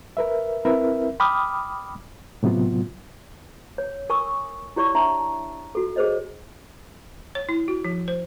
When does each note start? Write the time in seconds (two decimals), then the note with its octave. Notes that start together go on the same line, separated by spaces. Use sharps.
0.17 A#4 B4 E5
0.65 C4 E4 A#4 B4 E5
1.20 G5 B5 D6 D#6 F6
2.43 A2 C3 F#3 B3 F4
3.78 C#5
4.10 A#4 G#5 C#6 D#6 E6
4.76 E4 G4 C#5 D5 C#6
4.95 D4 E5 A5 A#5
5.75 F#4 A4
5.96 G#4 A#4 C5 C#5 D#5
7.35 C#5
7.49 E4
7.68 F#4
7.85 F3
8.08 C5